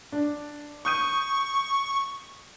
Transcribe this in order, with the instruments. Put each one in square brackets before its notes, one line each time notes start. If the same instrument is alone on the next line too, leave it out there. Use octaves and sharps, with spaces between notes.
[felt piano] D4
[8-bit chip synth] C#6 [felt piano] D#6 G6 D#7